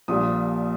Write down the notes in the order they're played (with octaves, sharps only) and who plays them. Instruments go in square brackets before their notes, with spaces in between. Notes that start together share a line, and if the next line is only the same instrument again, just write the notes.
[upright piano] A#1 A#2 G3 D#6